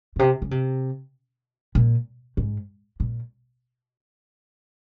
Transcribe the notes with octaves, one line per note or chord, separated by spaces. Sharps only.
A#2
C3
C#3
C3
A#2
G#2
A#2